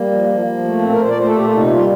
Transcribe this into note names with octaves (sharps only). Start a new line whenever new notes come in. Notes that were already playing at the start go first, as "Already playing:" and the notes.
Already playing: G3 A#3
F3
F3
F3
A3
A#2 C4
A#4
A#2 C5
D5
A3 C5
A4
A#2 G4
F4
C3 D#4
G3 F4